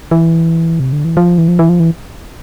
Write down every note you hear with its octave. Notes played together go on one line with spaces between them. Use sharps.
E3
C3
D3
E3
F3
E3
F3
E3
F3
E3